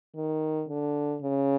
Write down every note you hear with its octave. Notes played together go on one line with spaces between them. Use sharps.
D#3
D3
C#3